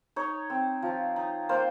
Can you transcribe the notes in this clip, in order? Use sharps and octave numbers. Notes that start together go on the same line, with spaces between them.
D#4 C#5
C4
F3
D#4
A#3 C5